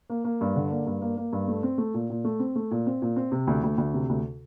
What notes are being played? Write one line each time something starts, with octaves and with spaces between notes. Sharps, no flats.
A#3
A#3
G2
D3
A#3
G2
A#3
A#3
G2
A3
C4
A3
A#2
A#2
A3
C4
A3
A#2
C4
A#2
C4
C3
D2
D2
D2
C3
D2